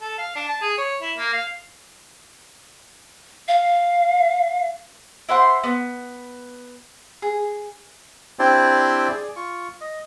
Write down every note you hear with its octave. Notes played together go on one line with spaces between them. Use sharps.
A4
F5
D4
A5
G#4
C#5
E4
A#3
F5
F5
E4 C5 F#5 C6
B3
G#4
C4 D4 E4 G4 C5 D5
G#4 D5
F4 C#6
D#5